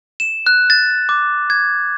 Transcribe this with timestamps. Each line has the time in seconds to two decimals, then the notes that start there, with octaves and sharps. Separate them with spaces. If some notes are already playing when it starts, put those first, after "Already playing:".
0.20 E7
0.47 F#6
0.70 A6
1.09 D6
1.50 G#6